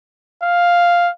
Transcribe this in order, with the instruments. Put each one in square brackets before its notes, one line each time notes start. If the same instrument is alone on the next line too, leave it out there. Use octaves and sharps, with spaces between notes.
[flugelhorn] F5